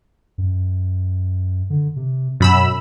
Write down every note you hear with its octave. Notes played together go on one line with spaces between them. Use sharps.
F#2
D3
C3
F#2 B2 B5 E6